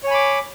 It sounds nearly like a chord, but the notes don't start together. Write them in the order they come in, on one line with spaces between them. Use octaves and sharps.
C#5 G#5 B5 D6